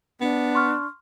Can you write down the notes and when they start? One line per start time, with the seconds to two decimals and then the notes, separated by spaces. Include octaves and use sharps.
0.21 B3 D4
0.55 C6 C#6 F6